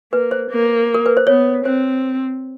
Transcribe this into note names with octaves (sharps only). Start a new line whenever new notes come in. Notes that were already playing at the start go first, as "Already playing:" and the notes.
A#3 B4
C5
A#3
A#4
B4
C5
B3 C#5
C4 C5